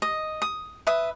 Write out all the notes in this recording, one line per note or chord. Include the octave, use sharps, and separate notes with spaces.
D#5
D#6
B4 E5 D#6